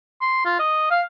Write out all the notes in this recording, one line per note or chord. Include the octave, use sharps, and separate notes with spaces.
C6
F4
D#5
F5